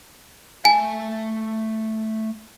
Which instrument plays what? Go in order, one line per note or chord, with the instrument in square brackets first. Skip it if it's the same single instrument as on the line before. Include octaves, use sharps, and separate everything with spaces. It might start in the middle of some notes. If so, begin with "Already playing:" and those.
[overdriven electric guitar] A3 A5 [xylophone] G#5